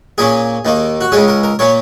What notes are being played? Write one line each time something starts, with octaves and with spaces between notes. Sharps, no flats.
A#2 A#3 C#4 G#4
D#2 D#3 A#3
F#4
C#2 C#3 G#3 C#4 G#4
A#4
A#4
A#2 A#3 C#4 C#5